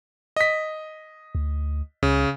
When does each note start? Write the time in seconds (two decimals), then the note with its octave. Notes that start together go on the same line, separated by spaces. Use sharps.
0.36 D#5 B6
1.35 D2
2.03 C#2 C#3